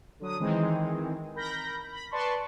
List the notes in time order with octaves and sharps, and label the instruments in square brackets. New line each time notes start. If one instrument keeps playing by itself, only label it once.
[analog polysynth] D3 F#3 D#6
D#3 E3 G#3 C4 D#4
A#4 B5 G6 A#6
B5
B4 D5 A5 C6 C#6